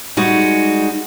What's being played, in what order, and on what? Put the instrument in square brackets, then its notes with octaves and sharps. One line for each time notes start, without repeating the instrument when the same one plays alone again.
[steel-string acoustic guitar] G3 G#3 D#4 F#4